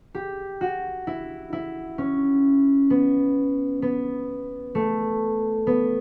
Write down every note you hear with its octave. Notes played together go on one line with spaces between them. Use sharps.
G4
F#4
E4
E4
C#4
B3
B3
A3
B3